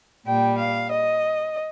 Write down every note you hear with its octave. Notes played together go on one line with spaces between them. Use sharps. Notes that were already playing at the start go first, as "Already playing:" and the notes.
A#2 G3 G5
F5
D#5